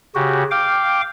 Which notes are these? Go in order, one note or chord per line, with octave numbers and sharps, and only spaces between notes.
C#3 F#4 G4
F5 G5 D6